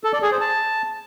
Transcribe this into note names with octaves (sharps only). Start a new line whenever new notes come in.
A4
D5
G#4
C5
A5